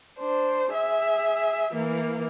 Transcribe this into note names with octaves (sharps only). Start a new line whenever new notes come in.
D4 C5
G#4 E5
E3 A#3